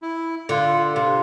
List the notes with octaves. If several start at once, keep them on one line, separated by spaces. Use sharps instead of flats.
E4
D3 F4
C3 F4